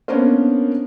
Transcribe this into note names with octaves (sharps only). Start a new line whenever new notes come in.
A#3 B3 C#4 D4 A#4 C5